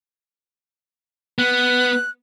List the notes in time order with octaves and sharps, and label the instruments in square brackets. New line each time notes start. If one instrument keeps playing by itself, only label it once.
[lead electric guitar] B3 [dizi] F#6